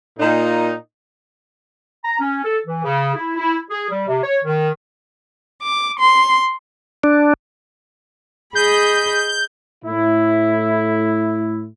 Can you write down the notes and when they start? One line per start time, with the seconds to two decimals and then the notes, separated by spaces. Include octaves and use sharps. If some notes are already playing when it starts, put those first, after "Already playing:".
0.19 A#2 D#4
2.04 A#5
2.19 C#4
2.44 A4
2.66 E3
2.83 C#3
3.15 E4
3.37 E4
3.70 G#4
3.89 G3
4.07 C3
4.21 C#5
4.44 D#3
5.63 D6
6.00 C6
7.04 D4
8.55 G#4 D#5 B5 G6
9.85 A2 E4